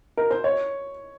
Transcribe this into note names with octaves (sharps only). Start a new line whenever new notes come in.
A#4
C5
C#5